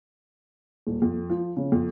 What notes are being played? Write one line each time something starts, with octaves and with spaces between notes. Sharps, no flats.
D#1
F2
F3
C#3
F2